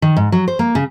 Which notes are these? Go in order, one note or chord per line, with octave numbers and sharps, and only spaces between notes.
D#3
G#2
F#3
C5
A#3
C#3